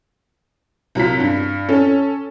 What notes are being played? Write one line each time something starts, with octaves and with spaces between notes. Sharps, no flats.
C2 F#3 F4 B6
G2
C#4 A4